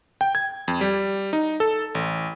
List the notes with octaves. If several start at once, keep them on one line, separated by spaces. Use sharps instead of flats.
G5
G#6
F2
G3
D#4
A4
A1